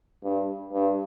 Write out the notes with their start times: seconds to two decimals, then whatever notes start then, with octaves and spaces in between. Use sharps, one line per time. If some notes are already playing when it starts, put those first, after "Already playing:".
0.23 G2
0.72 G2